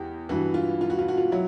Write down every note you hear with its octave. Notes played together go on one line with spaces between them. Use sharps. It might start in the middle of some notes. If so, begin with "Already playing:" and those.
Already playing: E2 G4
G2 E3 F#4
F4
F4
F#4
F4
F#4
F4
F#3 E4